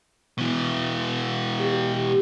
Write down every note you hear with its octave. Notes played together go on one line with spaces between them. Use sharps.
B2 E3
G4